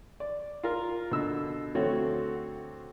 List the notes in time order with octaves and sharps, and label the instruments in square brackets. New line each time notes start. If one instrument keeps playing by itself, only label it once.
[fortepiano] D5
F4 A#4
B2 D3 E6
D2 A3 C4 F#4 C#5